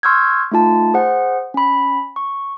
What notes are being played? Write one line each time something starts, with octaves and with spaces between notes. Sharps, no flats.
C6 C#6 E6 F6 G6 G#6
A3 D#4 F4 A5
G#4 C5 F#5
C#4 B5
C#6